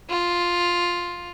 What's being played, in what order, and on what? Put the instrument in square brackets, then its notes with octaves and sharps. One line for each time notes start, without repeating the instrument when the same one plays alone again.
[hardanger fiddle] F4